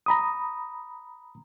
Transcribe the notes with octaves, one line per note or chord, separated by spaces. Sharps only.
A#5 B5 D#6